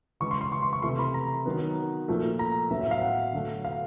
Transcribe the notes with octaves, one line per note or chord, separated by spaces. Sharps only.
C#3 E3 G#3 C#6
C6
C6
C#6
C6
C#6
C3 E3 A3 C6
B5
A#5
D#3 F#3 B3
A#2 F3 A3
A#5
A2 F#3 B3 E5
E5
F5
F#5
D3 F#3 A3
F5